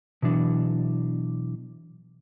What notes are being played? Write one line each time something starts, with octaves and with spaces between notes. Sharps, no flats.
B2 E3 F#3 D4